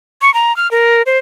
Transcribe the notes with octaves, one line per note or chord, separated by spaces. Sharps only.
C#6
A#5
F6
A#4
C5